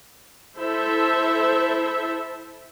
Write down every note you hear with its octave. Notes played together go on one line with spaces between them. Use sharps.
E4 A4 C5 E5